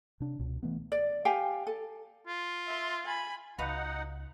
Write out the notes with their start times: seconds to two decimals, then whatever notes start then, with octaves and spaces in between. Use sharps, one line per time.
0.20 C3 D4
0.39 C#2 B2
0.63 E3 A3 B3
0.92 D5
1.25 G4 F5 G5 G#5
1.67 A4
2.27 F4
2.67 E5 C6
3.05 G#5 B5
3.58 C#2 D#4 F#4 B4 F5 F#5